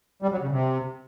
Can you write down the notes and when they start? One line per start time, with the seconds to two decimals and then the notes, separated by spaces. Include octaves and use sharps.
0.22 G3
0.32 F#3
0.42 C#3
0.52 C3